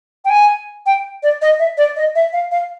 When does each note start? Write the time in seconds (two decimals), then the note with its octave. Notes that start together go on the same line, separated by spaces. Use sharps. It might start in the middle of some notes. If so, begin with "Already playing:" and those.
0.25 G5
0.30 G#5
0.86 G5
1.23 D5
1.42 D#5
1.59 E5
1.77 D5
1.96 D#5
2.15 E5
2.33 F5
2.51 F5